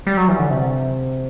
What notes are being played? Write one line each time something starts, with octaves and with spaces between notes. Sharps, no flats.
G3
F#3
E3
D3
C3